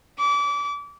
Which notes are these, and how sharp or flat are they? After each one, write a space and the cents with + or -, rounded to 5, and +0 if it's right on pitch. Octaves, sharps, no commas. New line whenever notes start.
D6 -30